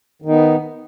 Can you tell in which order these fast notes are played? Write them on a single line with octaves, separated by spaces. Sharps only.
D#3 D#4 B3